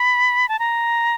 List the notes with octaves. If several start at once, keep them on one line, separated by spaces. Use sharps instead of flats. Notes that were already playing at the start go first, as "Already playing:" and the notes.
Already playing: B5
A5
A#5